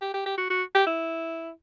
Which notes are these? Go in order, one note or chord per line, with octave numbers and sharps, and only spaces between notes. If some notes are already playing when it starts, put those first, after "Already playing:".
G4
G4
G4
F#4
F#4
G4
E4